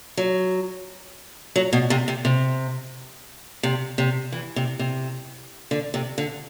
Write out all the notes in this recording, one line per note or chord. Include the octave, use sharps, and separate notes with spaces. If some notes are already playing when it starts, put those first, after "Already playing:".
F#3
F#3
B2
C3
C3
C3
C3
C3
E3
C3
C3
D3
C3
D3